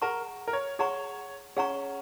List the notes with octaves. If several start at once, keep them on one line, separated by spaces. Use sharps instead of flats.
G#4 A#4 F#5 A#5 C#6
A#4
C#5
G#4 C#5 F#5 A#5 C#6
C#4 G#4 F#5 A#5 C#6